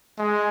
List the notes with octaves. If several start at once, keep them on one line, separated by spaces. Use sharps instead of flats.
G#3